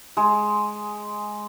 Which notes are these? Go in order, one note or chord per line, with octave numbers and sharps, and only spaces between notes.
G#3